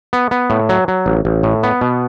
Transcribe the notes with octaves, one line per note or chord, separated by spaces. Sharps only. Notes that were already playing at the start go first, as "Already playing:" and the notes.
B3
B3
A2
F#3
F#3
A1
A1
A2
B3
B2